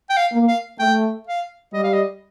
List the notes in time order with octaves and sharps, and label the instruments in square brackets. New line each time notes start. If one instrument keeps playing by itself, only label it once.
[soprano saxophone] G5
F5
[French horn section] A#3
[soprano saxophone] F5
[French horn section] A3 [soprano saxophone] G5
[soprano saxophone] F5
[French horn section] G3 [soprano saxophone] D#5
[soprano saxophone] F5
D#5